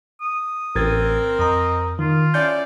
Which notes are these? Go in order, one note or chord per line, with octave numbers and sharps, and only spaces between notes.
D#6
A1 C4 A#4 G#6 A6
F2 D#5 A#5
D#3 F4
C#4 E4 D5 G6